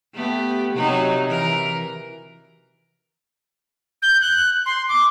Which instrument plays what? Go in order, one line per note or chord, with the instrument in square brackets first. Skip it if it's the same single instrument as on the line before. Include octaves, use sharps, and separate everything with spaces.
[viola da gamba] A3 B3 G4
C3 F#3 D#4
E3 A#4
[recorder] G6
F#6
C6
D6